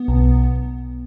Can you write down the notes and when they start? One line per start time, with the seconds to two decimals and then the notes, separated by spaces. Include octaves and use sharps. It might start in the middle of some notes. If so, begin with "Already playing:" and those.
Already playing: B3
0.08 B1